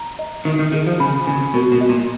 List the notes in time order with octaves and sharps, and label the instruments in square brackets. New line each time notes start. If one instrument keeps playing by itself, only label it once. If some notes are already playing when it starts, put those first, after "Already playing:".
Already playing: [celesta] A#5
D#5
[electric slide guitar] D#3 [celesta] D#4
[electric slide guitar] D#3
[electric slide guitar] D#3 [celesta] G#4
[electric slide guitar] F3
[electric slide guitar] C#3 [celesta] B5
[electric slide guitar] C#3 [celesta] G#5
[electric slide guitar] B2 [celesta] A#4
[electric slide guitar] B2
[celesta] D#5
[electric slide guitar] A#2